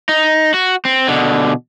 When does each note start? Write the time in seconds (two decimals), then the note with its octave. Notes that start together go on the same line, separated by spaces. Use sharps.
0.09 D#4
0.54 F#4
0.85 C4
1.09 B2 D3